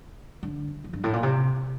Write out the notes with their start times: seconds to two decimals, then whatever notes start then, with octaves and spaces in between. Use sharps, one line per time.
0.43 D3
0.84 F2
0.93 G2
1.04 A2
1.13 A#2
1.23 C3